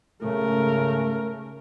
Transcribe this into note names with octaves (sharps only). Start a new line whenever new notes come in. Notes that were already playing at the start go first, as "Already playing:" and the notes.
G#2 C#3 A3 A#4